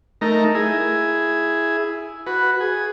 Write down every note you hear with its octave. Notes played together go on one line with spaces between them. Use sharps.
A3 D#4 A#4
E4 G#4
F#4 B4
G#4